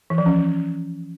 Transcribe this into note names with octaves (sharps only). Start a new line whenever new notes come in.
E3
F3
C#4